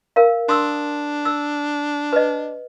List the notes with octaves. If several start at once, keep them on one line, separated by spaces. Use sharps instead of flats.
A#4 F5
D4 C6 D#6 E6
E6
B4 D#5